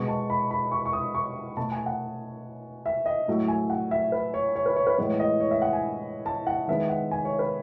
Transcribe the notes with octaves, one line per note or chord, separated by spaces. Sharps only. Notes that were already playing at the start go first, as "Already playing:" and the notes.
Already playing: B2 G#3 B3 C#6
A5
B5
B5
C#6
C#6
D#6
C#6
B2 A3 A5
G#5
F#5
E5
D#5
A2 F#3 A3
G#5
F#5
E5
B4
C#5
C#5
B4
C#5
B4
A2 E3 G#3 B3 C#5
D#5
C#5
E5
F#5
G#5
A5
F#5
D#3 G#3 B3 E5
F#5
G#5
C#5
B4